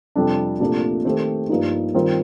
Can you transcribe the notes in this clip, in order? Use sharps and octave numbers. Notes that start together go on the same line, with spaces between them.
F2 C3 G3 D4 A4
C2 A#2 F3 A3 D4
D#3 A3 C4 G4 C5
G2 F3 A#3 D#4
D#3 G3 C4 F4 A#4